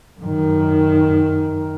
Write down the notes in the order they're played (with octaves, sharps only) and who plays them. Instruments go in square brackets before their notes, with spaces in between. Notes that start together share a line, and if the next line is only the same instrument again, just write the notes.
[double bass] F#2 D#3